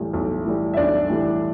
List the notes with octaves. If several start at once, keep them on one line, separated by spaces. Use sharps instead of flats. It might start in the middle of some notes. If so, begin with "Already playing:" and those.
Already playing: B1 A2 E3 G3
B1
A2 E3 G3
E5
B1 D4 D5
A2 E3 G3